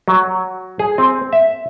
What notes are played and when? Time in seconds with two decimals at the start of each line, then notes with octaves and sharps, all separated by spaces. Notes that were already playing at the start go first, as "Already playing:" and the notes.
0.08 F#3
0.79 G#4
0.98 C4
1.33 E5